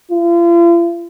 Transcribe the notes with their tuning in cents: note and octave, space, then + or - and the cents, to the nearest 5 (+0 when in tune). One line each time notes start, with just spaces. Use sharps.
F4 -40